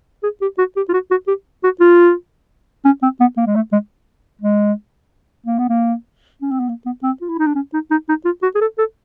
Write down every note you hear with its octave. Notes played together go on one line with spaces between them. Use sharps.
G#4
G4
F#4
G4
F4
F#4
F#4
G4
F#4
F4
C#4
C4
B3
A#3
G#3
A3
G#3
G#3
A#3
B3
A#3
C#4
C4
B3
A#3
B3
C4
F4
E4
D#4
D4
C#4
D#4
D#4
D#4
F4
F#4
G#4
A4
A4